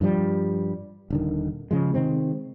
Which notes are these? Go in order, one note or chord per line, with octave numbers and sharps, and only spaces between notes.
G2 F3 G3
D#1 D3 D#3
C#3 F3 G#3
C3 D#3 G#3 C4